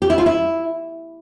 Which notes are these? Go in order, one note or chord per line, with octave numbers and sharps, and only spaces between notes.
G4
E4
F4
E4